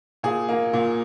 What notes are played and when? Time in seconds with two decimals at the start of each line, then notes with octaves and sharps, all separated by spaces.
0.23 A#2 G#4
0.49 A#3
0.73 A#2